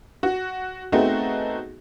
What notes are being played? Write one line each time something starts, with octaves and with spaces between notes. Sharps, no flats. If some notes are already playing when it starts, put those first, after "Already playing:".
F#4
A3 B3 C4 D#4 F#4 G#4